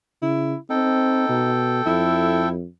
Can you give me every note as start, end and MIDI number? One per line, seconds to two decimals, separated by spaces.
0.22 0.54 49
0.22 0.56 64
0.70 1.26 60
0.70 1.52 63
0.70 2.49 69
0.70 2.49 79
1.29 1.82 47
1.86 2.65 41
1.86 2.53 64